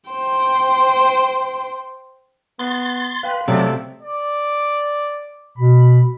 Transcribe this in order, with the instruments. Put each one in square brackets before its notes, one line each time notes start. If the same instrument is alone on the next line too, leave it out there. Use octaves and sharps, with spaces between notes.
[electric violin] C5 G5
[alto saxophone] B3 [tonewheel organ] C6 A6
[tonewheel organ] B4 [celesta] F5 G5 C6
[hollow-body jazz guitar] C3 [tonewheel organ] F#3 D5 [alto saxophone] A3
[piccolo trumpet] D5
[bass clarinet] B2 [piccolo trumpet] B5